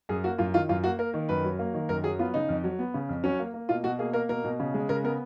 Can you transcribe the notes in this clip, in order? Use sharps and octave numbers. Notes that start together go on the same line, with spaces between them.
F#2 G#4
A#3 F#4
F#2 F4
D#3 F4
F#2 F4
A#3 F#4
A#3 A#4
D#3
F#2 B4
F#3
A#3
D#3
F#2 A#4
F#3 G#4
B3 F4
C#3 D#4
F2
F#3
B3
C#3
F2
F#3 C#4
A#3
A#3
B2 F4
B2 F#4
A#3 G#4
A#3 A#4
B2 A#4
B2
C#3
G#3
C#3 A#4
B3 A#4